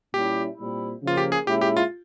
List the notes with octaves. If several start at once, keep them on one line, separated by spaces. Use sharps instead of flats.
A#2 G3 C#4 E4 G4
A#2 G3 C4 E4
C#3 F3 A#3 F4
G4
G#4
A#2 G#3 C#4 E4 G4
G4
F4